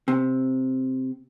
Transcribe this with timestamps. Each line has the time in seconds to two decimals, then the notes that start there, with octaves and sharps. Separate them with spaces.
0.08 C3